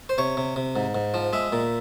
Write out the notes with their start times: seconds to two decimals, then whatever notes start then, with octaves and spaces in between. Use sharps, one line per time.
0.09 C5
0.18 C3 C#5
0.37 C3
0.56 C3
0.76 G#2
0.95 G#2
1.14 F3
1.33 G#3 E5
1.53 A#2